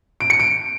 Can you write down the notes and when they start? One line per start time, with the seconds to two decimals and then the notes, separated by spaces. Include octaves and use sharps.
0.20 D7
0.30 C#7
0.40 D7